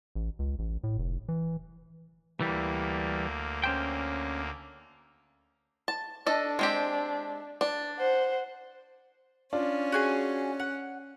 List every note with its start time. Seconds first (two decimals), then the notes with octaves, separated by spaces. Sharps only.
0.15 A1
0.39 C#2
0.59 A1
0.84 A2
0.98 F1
1.29 E3
2.41 D2 E3 G3 A#3
3.64 C#4 C5 G5
5.88 A5
6.26 D4 A4 D#5
6.59 G#3 C4 G4
7.61 D4
7.99 C5 F#5
9.53 C#4 D4 F4
9.92 F#4 G#4 G#5
10.60 F#5